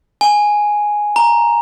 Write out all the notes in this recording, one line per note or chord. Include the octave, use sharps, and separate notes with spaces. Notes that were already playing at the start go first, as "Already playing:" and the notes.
G#5
A#5